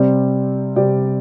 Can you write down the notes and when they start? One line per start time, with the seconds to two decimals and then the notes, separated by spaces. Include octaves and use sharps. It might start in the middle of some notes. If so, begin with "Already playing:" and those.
Already playing: C3 G3 C4 G4 D5
0.76 C3 G3 C4 G4 D5